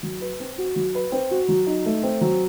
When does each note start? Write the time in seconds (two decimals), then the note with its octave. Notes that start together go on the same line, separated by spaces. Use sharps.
0.03 F#3
0.21 B4
0.40 C4
0.58 F#4
0.76 F#3
0.95 B4
1.12 C4
1.31 F#4
1.48 F#3
1.67 D#4
1.86 A3
2.03 C4
2.21 F#3